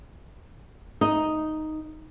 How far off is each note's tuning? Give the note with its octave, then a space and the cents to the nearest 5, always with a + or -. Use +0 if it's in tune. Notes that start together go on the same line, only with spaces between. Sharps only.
D#4 +0 D#5 +0